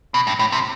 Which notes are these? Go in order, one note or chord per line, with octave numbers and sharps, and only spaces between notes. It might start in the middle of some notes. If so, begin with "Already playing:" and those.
B2
G2
A2
C3